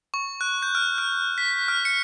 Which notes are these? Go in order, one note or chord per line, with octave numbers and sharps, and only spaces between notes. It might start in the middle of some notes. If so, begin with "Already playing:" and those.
C#6
F#6
G6
F6
F6
B6
F6
C#7